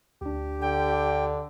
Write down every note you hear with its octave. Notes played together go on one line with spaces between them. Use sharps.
D2 D4 G4
D3 G5